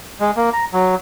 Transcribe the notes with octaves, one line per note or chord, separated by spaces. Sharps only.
G#3
A#3
A#5
F#3